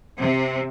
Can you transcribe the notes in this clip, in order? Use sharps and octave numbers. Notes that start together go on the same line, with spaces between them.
C3